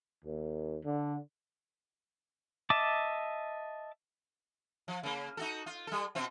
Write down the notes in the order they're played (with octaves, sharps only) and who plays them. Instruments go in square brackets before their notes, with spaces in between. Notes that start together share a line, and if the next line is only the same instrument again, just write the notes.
[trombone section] D#2
D3
[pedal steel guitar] D#5 E5 A5 D6
[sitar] F3
C#3 A#3
D#4 F#4 A4
F4
G3 A4
B2 C4 F4